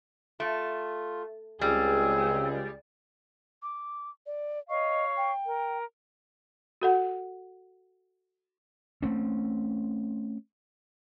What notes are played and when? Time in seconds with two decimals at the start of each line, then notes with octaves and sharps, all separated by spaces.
0.40 A3 F4
1.61 C#2 G3 C4 G#4
3.62 D6
4.26 D5
4.70 C#5 D#5 F5 C#6
5.17 G5
5.45 A#4
6.81 F#4 A4 F#5
9.02 A3 C4 C#4